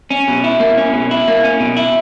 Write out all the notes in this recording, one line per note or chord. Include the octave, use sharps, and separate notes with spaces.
C#4
B2
E4
A#3
C#4
B2
E4
A#3
C#4
B2
E4